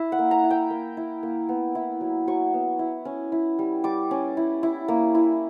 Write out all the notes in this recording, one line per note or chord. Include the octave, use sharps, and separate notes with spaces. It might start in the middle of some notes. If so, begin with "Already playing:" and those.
Already playing: E4 E5
F#5
A#3
A#5
E4
G5
A#3
E4
A#3
B3
E4
F#3
F#3 C#6
B3
E4
C#4
E4
G3
G3 D6
C#4
E4
E4
A#3
E4